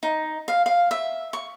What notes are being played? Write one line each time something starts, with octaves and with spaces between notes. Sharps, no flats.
D#4
F5
F5
E5
C#6